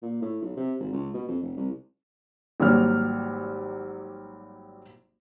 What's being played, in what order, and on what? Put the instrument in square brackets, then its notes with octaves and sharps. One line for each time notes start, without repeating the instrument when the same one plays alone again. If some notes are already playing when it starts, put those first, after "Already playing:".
[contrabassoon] A#2
A2
B1
C3
G#1
C#2
B2
F2
F1
C2
[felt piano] G#1 F#3 G3 A#3 F6